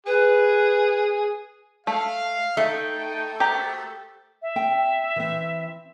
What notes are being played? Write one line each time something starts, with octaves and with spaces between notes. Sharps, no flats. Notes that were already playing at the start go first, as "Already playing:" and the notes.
G#4 B4
A3 F5
A3 D#4 E5 G5
F#4 G4 A#4 C5 A#5
E5
C4 G5
E3 C4